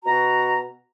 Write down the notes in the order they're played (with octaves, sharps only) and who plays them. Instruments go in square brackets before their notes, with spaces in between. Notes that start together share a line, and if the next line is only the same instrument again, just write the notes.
[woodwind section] B2 F#4 A#5